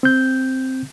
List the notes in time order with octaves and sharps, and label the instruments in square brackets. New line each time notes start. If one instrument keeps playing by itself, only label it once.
[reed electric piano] C4 G6